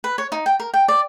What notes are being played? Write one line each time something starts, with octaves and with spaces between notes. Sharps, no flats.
B4
C#5
D#4
G5
A#4
G5
D5